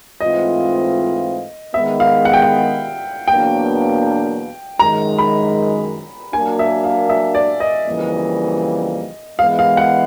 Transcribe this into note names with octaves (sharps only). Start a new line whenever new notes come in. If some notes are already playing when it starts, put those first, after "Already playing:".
G#2 E3 A3 C4 F4 D#5
D#3 G#3 B3 E5
F5
F#5
G5
F#5
E2 B2 F#3 A#3 D4 G5
F#2 D#3 G#3 A#5
B5
F#3 A#3 D4 G#5
E5
F5
E5
D5
D#5
F2 C#3 E3 G3 A#3
E3 G#3 B3 F5
F5
F#5